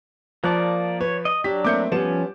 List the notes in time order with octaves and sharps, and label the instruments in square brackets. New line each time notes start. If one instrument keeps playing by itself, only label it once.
[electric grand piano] F3 [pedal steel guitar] A#3 D5 [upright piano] A5 F#6
[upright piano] B4 [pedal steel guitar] C#5
[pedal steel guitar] D#5
[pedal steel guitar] F#3 D4 [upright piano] G4 [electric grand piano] B6
[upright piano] A3 A#3 C4 [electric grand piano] D6 G6 C#7
[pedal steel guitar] F3 C#4 [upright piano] G3 B3 E7